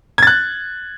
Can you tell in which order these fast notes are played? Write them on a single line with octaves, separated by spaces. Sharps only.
G#6 A6 F#6